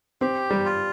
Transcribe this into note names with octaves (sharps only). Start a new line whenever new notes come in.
C4 G4
G3
F4